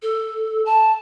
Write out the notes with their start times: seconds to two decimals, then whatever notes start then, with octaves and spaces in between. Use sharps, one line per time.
0.02 A4
0.66 A5